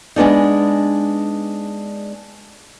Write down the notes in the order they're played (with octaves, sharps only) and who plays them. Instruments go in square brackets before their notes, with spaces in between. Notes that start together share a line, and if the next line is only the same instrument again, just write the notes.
[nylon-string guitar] G#3 B3 D4 D#4